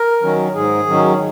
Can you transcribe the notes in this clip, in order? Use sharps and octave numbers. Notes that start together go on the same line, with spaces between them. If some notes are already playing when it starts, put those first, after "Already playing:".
Already playing: A#4
D#3 F#3 C#4
G#2 G#4
D#3 F#3 C#4